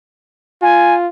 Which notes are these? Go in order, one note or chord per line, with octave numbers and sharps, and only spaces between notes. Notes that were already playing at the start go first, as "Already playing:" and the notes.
F4 G#5